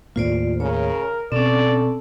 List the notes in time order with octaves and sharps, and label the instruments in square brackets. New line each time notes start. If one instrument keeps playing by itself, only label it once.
[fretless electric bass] D#2 A2 A#3 [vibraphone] F4 C5 D5
[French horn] C#3 [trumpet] A#4 [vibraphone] C#5
[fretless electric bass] B2 [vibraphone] C4 C#4 [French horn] A4 [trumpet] D5